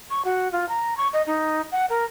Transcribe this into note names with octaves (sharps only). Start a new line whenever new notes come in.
C#6
F#4
F4
A#5
C#6
D#5
D#4
F#5
A#4